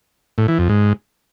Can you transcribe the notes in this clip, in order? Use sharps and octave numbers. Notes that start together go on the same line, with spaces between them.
A2
E3
F2
G#2